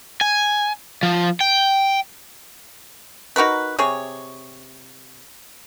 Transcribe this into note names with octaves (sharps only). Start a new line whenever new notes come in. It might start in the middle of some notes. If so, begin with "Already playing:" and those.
G#5
F3
G5
D#4 F#4 A#4 B4
C3 G#4 C#5